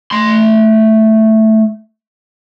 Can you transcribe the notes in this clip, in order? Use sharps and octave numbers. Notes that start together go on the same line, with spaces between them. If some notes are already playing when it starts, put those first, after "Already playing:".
A3 C6